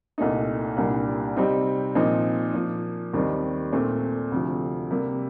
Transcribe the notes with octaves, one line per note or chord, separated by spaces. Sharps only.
C2 A#2 A3 D#4
C2 A#2 G3 D4
C3 G3 C4 D#4
A#2 F3 C4 D#4
A#2 F3 A#3
D#2 D#3 G3 C4
A#2 A3 C4
D2 C3 F3
C3 G3 A#3